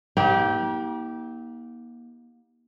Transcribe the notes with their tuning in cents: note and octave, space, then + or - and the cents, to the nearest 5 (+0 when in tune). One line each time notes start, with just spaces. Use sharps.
A#3 +40 D#4 +45 G4 -15